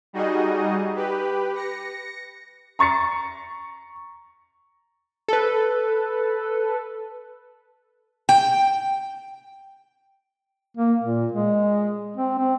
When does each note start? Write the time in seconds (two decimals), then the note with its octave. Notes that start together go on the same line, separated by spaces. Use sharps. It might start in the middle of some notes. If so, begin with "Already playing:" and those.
0.13 G3 D#4 F#4 G#4 D#5
0.95 G4 B4
1.55 A#6 C#7
2.79 A#5 C#6 A6 C#7
5.28 A4 B4
8.29 G5
10.77 A#3
11.02 A#2
11.32 G#3
12.17 C4
12.38 C4